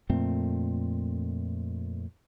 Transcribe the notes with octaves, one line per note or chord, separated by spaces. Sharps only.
F2 A#2 A3 C4